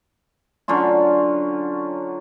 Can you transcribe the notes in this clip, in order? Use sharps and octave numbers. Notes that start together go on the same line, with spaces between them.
D3 F#3 C#4 F4